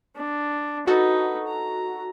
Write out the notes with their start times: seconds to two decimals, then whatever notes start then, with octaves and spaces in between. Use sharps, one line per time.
0.16 D4
0.87 D#4 F#4 A4 B4
1.47 A#5